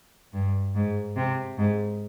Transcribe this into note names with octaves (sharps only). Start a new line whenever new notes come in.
G2
G#2
C3
G#2